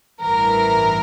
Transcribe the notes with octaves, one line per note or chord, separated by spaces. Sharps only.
A1 G2 E3 A#4